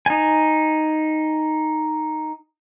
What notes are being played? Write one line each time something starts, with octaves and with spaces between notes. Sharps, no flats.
D#4 G#5